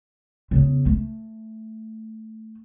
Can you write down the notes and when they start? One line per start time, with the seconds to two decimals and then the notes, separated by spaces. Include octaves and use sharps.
0.51 E2 C#3
0.86 A3